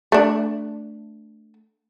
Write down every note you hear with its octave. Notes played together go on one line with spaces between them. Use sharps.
A3 D4